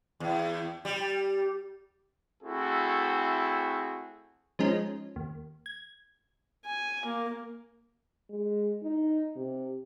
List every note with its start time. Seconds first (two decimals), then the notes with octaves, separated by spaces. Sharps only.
0.20 E2
0.85 G3
2.42 A3 C4 E4 F#4 G#4 A4
4.59 F3 G#3 C#4 D#4
5.16 D#2
5.66 G#6
6.65 G#5
7.05 A#3
8.30 G#3
8.83 D#4
9.36 C3